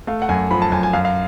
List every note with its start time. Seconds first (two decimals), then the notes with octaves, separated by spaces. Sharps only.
0.07 A3 F5
0.22 F#5
0.29 F#2 G#5
0.51 F3 B5
0.62 A5
0.72 F#2 G#5
0.83 G#5
0.93 F#2 F5
1.05 F5